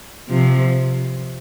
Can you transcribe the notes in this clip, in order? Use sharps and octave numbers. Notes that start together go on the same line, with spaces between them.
C3 F3